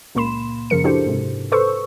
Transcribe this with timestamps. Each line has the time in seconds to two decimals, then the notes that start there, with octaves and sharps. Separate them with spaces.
0.15 C#2 A#2 A#3 B5 C6 E7
0.70 F#2 C#3 F3 A#4 C#7
0.84 D4 E4 F#4 G4 A4 C5
1.06 G#2 C3
1.52 A4 B4 C5 C#6 E6